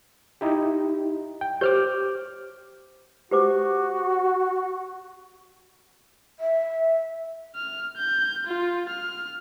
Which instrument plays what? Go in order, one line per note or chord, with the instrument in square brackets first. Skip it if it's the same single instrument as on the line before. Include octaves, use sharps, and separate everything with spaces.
[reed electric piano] D#4 E4 G4
G5
[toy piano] G4 C5 C#5 [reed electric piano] D6 F6 G6
[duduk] F#4 [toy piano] G4 C5 D6
[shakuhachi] E5
[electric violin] F6
G6
F4
F6